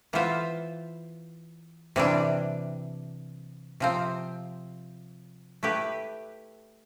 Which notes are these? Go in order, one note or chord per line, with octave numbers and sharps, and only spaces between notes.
E3 B3 F4 C5 E5
C3 E3 G3 D4
C3 F3 C4
A3 E4 G4 B4